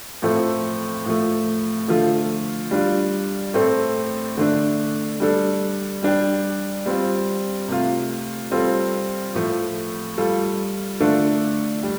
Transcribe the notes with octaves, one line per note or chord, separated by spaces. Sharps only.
A2 F3 A3 C4 A4
A2 F3 A3
D3 F3 A3 F4 A4
G3 D4 F4
A2 A3 C4 A4
D3 A3 D4
G3 D4 A4
G3 D4 G4
G3 C4 F4
C3 A3 F4
G3 C4 F4 A4
A2 F3 A3
G3 F4 A4
D3 A3 D4 F4 A4
G3